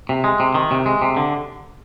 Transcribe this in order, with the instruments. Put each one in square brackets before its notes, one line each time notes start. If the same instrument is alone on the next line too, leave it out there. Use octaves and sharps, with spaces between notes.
[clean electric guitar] C3
G#3
C3
D#3
C3
G#3
C3
D3